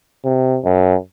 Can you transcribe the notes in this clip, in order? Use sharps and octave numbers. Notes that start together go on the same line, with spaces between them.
C3
F#2